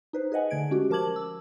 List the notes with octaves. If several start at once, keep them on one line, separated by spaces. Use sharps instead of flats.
D#4 B4 C5
G#4 B4 D#5 F#5 G#5
D3 A3 G#6 D7
G#3 C#4 F#4 G4
F3 A#4 A5 D6 G#6 F#7
E6